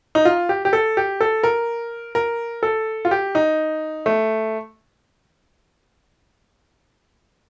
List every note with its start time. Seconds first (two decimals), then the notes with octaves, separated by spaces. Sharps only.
0.15 D#4
0.25 F4
0.49 G4
0.65 G4
0.73 A4
0.97 G4
1.21 A4
1.44 A#4
2.15 A#4
2.63 A4
3.05 F4
3.11 G4
3.35 D#4
4.06 A3